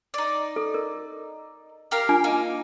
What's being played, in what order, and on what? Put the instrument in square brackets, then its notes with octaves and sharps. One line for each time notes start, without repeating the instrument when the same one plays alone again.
[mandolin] D#4 D5
[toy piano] A4
A#4
[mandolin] G4 A#4 F5
[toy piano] D4 F4 G#5
[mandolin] A#3 D#4